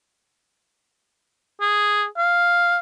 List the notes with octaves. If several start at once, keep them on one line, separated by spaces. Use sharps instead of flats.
G#4
F5